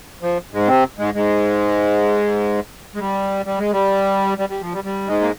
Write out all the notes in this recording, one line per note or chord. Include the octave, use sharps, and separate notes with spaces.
F3
G#2 G#3
C3 C4
G#2 G#3
G#2 G#3
G#3
G3
G3
G#3
G3
G3
G3
F3
G3
G3
G#2 G#3
A#3